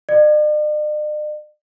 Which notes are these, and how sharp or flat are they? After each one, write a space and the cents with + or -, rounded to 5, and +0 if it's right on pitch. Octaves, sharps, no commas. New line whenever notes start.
D5 +45